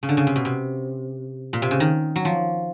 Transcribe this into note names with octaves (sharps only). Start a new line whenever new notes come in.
C#3
D3
C#3
C3
B2
C3
A#2
C3
C#3
D#3
F#3
F3